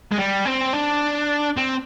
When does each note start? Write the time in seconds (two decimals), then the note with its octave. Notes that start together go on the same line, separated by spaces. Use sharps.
0.12 G#3
0.18 G3
0.46 C4
0.73 D4
1.57 C4